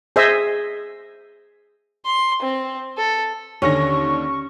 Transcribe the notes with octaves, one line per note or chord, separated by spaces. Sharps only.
G#4 C5 D#5 E5
C6
C4
A4
D#2 D3 C#4 C#6 A#6